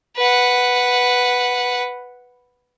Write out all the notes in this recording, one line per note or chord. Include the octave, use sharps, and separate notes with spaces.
B4 F#5